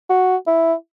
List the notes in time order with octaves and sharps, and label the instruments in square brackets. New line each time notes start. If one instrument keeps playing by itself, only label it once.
[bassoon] F#4
E4